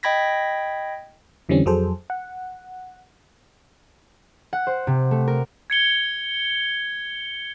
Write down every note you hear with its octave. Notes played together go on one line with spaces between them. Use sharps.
D#5 G5 B5 G#6 A#6 B6
F2 D3 E3 G3 C4 C#4
F2 F#3 G#4 A4 C5
F#5
F#5
C5
C3
A3
A#4
G#6 C#7 G7